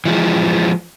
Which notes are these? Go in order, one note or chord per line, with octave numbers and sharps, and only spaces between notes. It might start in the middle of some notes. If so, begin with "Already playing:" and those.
E3 F3 G#3